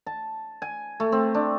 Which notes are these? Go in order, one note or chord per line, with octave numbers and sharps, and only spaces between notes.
A5
G#5
A3
C4
D4